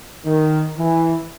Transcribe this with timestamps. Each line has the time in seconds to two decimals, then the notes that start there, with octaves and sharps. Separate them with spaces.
0.25 D#3
0.78 E3